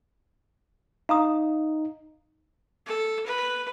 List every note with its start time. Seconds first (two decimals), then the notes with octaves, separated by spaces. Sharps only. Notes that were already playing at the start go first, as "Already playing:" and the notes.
1.09 D#4 F5 A#5 D#6
2.86 A4
3.26 B4